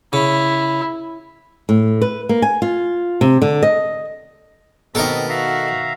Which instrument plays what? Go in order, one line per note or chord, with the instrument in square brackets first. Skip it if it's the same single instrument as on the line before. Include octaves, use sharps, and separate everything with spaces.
[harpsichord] C#3 [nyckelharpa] E4
[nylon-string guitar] A2
B4
A#3
G#5
F4
C3
D3
D#5
[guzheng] B2 D#3 [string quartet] B3 C4 [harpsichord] A4 A#4 D#5
[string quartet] F#4 [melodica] E5 F5 A#5